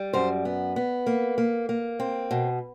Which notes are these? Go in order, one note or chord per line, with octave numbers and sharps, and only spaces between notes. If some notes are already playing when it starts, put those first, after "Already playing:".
Already playing: G3
F#2 C5
B3
B3
A#3
A#3
A#3
C4
B2